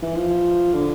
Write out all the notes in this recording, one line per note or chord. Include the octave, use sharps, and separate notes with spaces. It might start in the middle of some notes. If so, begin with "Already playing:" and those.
E3
F3
D3